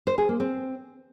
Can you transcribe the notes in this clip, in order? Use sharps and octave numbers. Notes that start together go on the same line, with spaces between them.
C5
G#4
A#3
C4